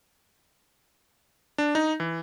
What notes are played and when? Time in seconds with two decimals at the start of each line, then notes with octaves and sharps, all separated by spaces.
1.58 D4
1.75 D#4
2.00 E3